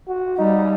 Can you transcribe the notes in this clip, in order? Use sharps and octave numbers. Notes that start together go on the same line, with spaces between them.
F#4
G3 D#4